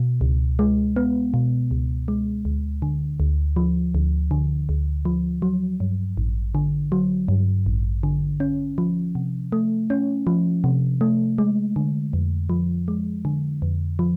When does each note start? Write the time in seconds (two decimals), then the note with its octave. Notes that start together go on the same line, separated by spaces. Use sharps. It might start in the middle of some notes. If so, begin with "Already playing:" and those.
Already playing: B2
0.21 C#2
0.59 G#3
0.96 B3
1.34 B2
1.71 C#2
2.08 G#3
2.45 D2
2.82 D3
3.20 D2
3.56 F3
3.95 D2
4.31 D3
4.69 D2
5.05 F3
5.42 F#3
5.80 G2
6.17 A1
6.55 D3
6.92 F#3
7.28 G2
7.66 A1
8.03 D3
8.40 C#4
8.78 F3
9.15 C3
9.52 A3
9.90 C#4
10.27 F3
10.64 C3
11.01 A3
11.38 G#3
11.76 D3
12.13 F2
12.50 F3
12.88 G#3
13.25 D3
13.62 F2
13.99 F3